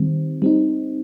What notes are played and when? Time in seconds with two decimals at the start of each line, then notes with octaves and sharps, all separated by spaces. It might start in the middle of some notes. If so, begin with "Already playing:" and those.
Already playing: D#3 G3 C4
0.42 G3 C4 D#4